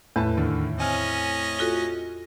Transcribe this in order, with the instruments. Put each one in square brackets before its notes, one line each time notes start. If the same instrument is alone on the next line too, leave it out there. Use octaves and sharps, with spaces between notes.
[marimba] E2 [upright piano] A2 [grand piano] B4 A5
[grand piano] D#2 D3 D#3
[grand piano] C4 G#5 F6 [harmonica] C#4 D#5
[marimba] F4 F#4 A4